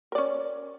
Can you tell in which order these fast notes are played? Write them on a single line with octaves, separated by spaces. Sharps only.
A#4 D5 C#4